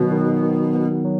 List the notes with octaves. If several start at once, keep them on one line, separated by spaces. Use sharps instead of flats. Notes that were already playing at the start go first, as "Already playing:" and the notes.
Already playing: B2 D#3 F#3 B3
D#3
D#3
B3
F#3